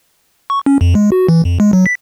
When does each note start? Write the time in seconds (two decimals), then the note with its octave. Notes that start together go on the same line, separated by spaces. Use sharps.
0.50 C#6
0.66 C#4
0.81 F2
0.95 G#3
1.12 F#4
1.29 E3
1.45 F2
1.60 G#3
1.73 F#3
1.86 B6